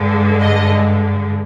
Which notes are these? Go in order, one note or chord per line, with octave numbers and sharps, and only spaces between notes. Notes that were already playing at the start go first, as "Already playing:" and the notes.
Already playing: G2 D3 G#3
D#5